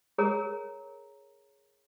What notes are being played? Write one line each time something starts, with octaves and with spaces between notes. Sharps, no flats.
G#4 A#4 C#5 A#5